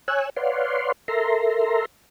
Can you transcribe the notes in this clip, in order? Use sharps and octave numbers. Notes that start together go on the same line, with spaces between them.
C#5 G#5 E6 F#6
B4 C#5 D5 F5 F#5 C6
A4 A#4 E5 A#5 C6